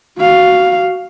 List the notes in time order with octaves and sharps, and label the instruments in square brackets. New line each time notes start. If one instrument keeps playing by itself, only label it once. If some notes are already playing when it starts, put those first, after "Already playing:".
[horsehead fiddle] F#4 F5